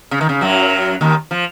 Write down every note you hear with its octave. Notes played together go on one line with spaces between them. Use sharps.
C#3
D#3
C#3
F#2 F#3
D#2 D#3
F3